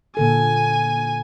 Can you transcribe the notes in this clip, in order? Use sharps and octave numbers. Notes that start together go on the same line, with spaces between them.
A#2 D3 A4 G#5